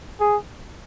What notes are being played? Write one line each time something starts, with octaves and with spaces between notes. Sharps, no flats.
G#4